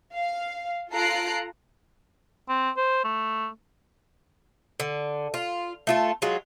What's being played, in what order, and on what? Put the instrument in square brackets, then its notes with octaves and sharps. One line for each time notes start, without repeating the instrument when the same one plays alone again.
[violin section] F5
F4 A4 A#5 F#6 C7 D7
[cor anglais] C4
C5
A3
[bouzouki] D3
F4
A3 F4 A4
F#3 G#3 F4